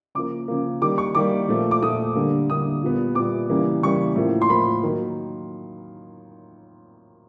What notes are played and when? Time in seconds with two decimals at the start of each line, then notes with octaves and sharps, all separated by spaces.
0.15 C#3 F3 A#3 D6
0.48 C#3 F3 A#3
0.82 D#3 G3 A#3 D6
0.98 C#6
1.15 D#3 G3 A#3 D6
1.48 A#2 F3 A3
1.71 D6
1.82 A#2 F3 A3 D#6
2.15 D3 G3 A#3
2.49 D3 G3 A#3 D#6
2.83 A#2 G3 B3
3.15 A#2 G3 B3 D6
3.49 C#3 E3 G3 A#3
3.82 C#3 E3 G3 A#3 C#6
4.16 A2 F3 A#3
4.42 C6
4.50 A2 F3 A#3 B5
4.83 D#3 F#3 A#3